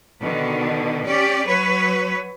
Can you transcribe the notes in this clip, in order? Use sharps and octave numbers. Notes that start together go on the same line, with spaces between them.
B2 D3 D#3
C#4 G4 D5
F#3 B4 C#5